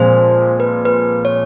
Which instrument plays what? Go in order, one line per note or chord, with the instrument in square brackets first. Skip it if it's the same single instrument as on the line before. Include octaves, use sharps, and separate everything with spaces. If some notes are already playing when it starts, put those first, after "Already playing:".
Already playing: [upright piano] A#2 F3 G#3 C4 [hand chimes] C5
[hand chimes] B4
B4
C#5